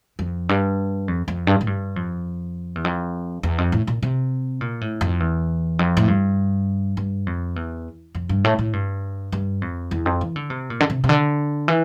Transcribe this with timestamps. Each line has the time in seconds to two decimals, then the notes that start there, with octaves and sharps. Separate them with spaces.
0.19 F2
0.49 G2
1.08 F2
1.28 F2
1.47 G2
1.61 A2
1.67 G2
1.96 F2
2.75 E2
2.84 F2
3.43 E2
3.58 F2
3.72 A2
3.87 A#2
4.03 C3
4.61 A#2
4.81 A2
5.01 F2
5.20 E2
5.79 F2
5.97 A2
6.08 G2
6.97 G2
7.27 F2
7.56 E2
8.15 F2
8.29 G2
8.44 A2
8.59 A2
8.73 G2
9.32 G2
9.62 F2
9.91 E2
10.06 F2
10.21 E3
10.36 D3
10.50 C3
10.70 A#2
10.80 D3
10.90 C3
11.04 C3
11.09 D3
11.68 E3